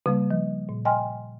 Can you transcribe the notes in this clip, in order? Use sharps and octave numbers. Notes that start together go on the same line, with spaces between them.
C#3 G3 A#3
F3
A#2
D#5 G5 G#5 C6 F6